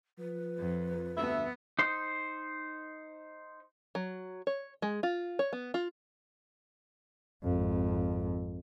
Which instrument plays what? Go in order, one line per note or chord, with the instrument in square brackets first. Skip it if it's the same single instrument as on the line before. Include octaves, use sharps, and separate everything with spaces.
[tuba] F3 [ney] B4
[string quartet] F2
[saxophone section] D2 G2 E5 [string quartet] B3
[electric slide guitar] D#4 C5
[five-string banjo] F#3
C#5
G#3
F4
C#5
B3
F4
[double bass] G#1 F2